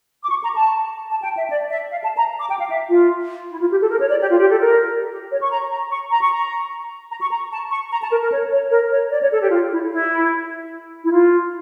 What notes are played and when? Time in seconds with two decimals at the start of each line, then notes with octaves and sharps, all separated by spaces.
0.23 D6
0.29 C#6
0.43 A#5
0.56 A5
1.10 A5
1.23 G5
1.36 E5
1.50 D5
1.70 E5
1.90 F5
2.03 A5
2.16 A#5
2.40 D6
2.50 G5
2.59 F5
2.70 E5
2.89 F4
3.50 E4
3.60 F4
3.71 G4
3.81 A4
3.90 A#4
4.00 C#5
4.10 D5
4.21 G4
4.30 F4
4.40 G4
4.51 A4
4.61 A#4
5.10 G4
5.31 C#5
5.41 C#6
5.51 A#5
5.70 A#5
5.90 C#6
6.11 A#5
6.22 C#6
6.32 A#5
7.10 A#5
7.21 C#6
7.31 A#5
7.52 A5
7.71 C#6
7.92 A#5
8.01 A5
8.11 A#4
8.21 A#4
8.32 C#5
8.51 C#5
8.71 A#4
8.91 C#5
9.11 D5
9.22 C#5
9.32 A4
9.41 G4
9.51 F4
9.71 E4
9.91 E4
11.04 E4
11.12 F4